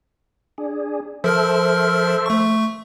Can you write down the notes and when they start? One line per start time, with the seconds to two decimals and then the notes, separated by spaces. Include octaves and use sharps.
0.58 D4 G#4
1.24 F3 A4 A#4 C5 E5 F6
2.26 A3 C#6